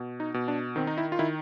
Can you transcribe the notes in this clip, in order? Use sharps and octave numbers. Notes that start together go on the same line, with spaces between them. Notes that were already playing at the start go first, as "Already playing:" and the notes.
Already playing: B2
D#4
B2
D4
D#3 C4
D#4
E4
F4
D#3 E4